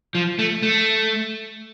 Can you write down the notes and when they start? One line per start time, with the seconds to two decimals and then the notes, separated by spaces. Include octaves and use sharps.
0.15 F3
0.39 A3
0.62 A3